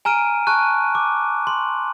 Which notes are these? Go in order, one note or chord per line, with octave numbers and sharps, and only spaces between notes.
G#5 A#5 F6 D7 D#7
A5 C#6 F#6
D6
C6